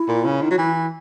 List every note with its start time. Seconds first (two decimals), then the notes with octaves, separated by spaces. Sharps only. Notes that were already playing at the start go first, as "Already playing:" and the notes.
Already playing: E4
0.09 A#2
0.25 C#3
0.42 D#3
0.51 F#3
0.58 E3